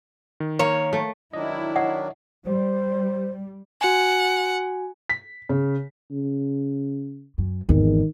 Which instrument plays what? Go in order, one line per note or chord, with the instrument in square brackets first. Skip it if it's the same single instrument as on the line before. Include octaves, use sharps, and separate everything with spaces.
[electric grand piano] D#3
[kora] A#3 [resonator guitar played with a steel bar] C#5
[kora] A3
[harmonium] D#3 F#3 D4 [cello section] E4 [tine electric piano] D#5
[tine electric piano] C#5 D#5 [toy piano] F#5
[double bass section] G3 [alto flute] C5
[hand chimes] F#4 G#5 [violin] F#5
[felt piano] B6
C#3
[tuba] C#3
[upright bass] F#2
[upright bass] G#1 E2 [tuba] D#3